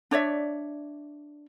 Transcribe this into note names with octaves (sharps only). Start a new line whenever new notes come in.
D4 C#5 D5 E5